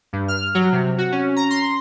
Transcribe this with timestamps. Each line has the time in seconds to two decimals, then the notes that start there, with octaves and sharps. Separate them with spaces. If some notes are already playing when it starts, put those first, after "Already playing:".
0.13 G2
0.28 F6
0.55 F#3
0.72 C3
0.98 F#4
1.12 C#4
1.36 A#5
1.50 C6